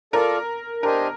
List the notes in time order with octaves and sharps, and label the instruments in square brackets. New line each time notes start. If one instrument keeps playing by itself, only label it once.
[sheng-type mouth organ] F4 A4 D5 [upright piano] A#4
[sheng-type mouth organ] D4 G4 C5 D#5 G#5 [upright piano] A#4